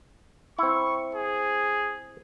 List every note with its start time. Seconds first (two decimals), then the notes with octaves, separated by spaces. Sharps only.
0.59 C4 E4 C#6
1.15 G#4